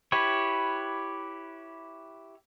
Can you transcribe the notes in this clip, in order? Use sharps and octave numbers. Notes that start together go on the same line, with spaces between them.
E4 G4 B4 C#5